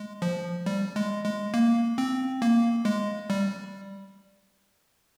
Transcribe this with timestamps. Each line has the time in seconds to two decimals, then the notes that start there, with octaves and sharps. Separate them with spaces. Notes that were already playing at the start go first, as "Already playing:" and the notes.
Already playing: G#3
0.22 F3
0.66 G3
0.96 G#3
1.24 G#3
1.54 A#3
1.98 C4
2.42 A#3
2.85 G#3
3.30 G3